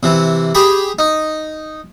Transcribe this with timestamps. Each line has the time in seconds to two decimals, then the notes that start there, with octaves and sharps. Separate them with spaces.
0.03 C3 E3
0.55 G4 G#4 B5
0.99 D#4